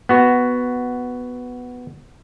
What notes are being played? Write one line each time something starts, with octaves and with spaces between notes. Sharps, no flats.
B3 F#4